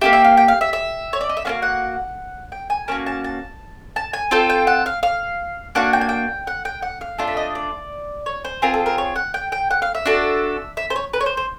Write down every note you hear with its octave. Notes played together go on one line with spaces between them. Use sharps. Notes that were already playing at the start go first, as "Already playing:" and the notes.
A#3 D#4 G4 E5
E5
F5
G5
F5
E5
E5
C#5
D5
D#5
E5
A#3 C#4 F#4 F5
F#5
G5
G#5
A#3 C#4 F#4 A5
A5
A5
A5
G#5
C4 F4 A4 G5
G5
F#5
F5
F5
A#3 D4 F#4 F#5
G5
G#5
G5
F#5
G5
F#5
F5
A3 D4 F4 A4
E5
D#5
D5
C#5
C5
C4 F4 G#4 A#4
A4
A#4
C#5
F#5
G5
G5
F#5
F5
E5
D4 F#4 A4
E5
C5
C#5
B4
C#5
C5
C5